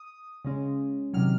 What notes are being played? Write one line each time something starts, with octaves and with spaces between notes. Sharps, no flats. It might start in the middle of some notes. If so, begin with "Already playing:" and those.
Already playing: D#6
C#3 G#3 C#4
C3 D#3 F#3 F6